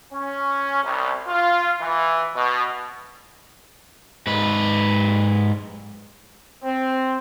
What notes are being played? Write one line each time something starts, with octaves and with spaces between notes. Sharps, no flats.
C#4
C2
F4
E3
B2
G#2 B4
C4